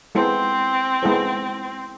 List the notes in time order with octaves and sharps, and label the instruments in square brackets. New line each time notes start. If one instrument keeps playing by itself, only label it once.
[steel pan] G#3 B3 E4 A4 C5 [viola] C4
[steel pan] G#3 B3 E4 A4 C5